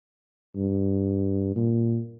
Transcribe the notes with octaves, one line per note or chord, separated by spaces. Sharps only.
G2
A#2